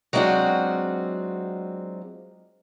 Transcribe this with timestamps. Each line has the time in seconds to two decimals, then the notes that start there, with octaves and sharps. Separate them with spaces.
0.13 F#3 G#3 C4 D4 F4 F#4